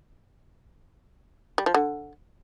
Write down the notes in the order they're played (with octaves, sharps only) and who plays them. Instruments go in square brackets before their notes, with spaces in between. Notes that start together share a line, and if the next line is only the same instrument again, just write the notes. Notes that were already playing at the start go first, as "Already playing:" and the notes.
[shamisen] G3
F3
D3